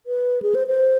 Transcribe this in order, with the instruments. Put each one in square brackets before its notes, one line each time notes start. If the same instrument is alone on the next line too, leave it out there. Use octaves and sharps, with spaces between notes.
[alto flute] B4
G#4
C5
C5